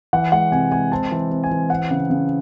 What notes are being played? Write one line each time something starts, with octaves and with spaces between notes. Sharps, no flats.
E3 F#5
G#3 F#5
C3 G#5
G#3 G#5
C4 A5
E3
C4
G#5
E3
C4 F#5
C#3
C#3